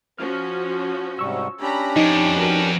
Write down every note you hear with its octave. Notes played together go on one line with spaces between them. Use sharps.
F3 C#4 F#4 F6
G#2 C3 G3 C#6 E6
C#4 D4 G4 A#5 B5
F2 D#4
B3 F#4 A#4